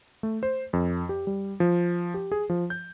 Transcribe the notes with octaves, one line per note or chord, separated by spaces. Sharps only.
A3
C5
F2
G4
G3
F3
G4
G#4
F3
G6